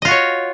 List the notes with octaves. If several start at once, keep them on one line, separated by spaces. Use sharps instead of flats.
F4 F#4 C#5 D#5